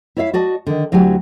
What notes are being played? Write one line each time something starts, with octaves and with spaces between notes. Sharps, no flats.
E4 C#5 D5 E5 F5
F#4 D5 D#5 A5
D3 D#3
D2 F#3 E4 G4 G#5